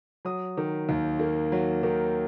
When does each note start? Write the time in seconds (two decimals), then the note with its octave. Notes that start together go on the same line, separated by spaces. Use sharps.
0.25 F#3 D#6
0.57 D#3
0.89 D#2
1.19 A#3
1.52 F#3
1.83 D#3